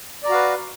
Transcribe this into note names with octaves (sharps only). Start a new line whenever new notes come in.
F#4 B4 D5 F5 A#5